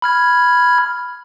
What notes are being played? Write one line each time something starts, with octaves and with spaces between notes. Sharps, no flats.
B5 F6 G#6